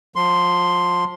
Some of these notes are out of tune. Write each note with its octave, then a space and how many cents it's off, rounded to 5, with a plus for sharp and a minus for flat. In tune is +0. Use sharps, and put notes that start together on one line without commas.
F3 +30 C6 +0